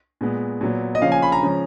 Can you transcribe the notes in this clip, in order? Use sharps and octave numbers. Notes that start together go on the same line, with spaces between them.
A#2 G#3 B3
A#2 F#3 B3
D#5
C#3 F3 A#3 C#4 F5
G#5
B5
A#5
C#3 F3 G#3 C#4